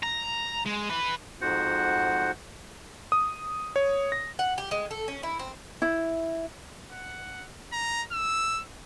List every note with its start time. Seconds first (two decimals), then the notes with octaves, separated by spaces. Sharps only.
0.03 A#5
0.66 G#3
0.90 E4 B4
1.41 F2 G#2 F#4 C5 F#5
3.12 D#6
3.76 C#5
4.12 A#6
4.39 F#5
4.58 G4
4.71 G#3
4.91 A4
5.08 C#4
5.23 E4
5.39 C4
5.82 E4
6.92 F#5
7.72 A#5
8.12 E6